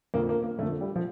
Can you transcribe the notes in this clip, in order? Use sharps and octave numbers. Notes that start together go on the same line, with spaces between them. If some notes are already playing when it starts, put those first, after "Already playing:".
F2 D3 F3 A#3
A#3
A#3
F2 D3 F3 A3
G3
F3